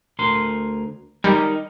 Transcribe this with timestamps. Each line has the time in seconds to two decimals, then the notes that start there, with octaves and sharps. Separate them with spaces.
0.19 D2 A#4 C6
1.24 G3 D#4 A#4